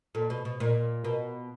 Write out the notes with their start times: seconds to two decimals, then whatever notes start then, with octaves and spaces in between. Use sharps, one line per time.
0.15 A#2 A4
0.30 B2
0.45 B2
0.60 A#2 A#4
1.04 B2 A#4